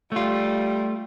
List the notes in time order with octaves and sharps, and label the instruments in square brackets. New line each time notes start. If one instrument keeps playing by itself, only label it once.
[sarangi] G3 [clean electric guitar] A3 F4